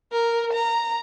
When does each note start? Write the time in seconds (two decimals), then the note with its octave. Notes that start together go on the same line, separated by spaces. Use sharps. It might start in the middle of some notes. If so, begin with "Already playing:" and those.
0.12 A#4
0.53 A#5